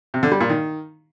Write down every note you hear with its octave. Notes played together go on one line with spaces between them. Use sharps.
C3
D3
G3
A#2
D#3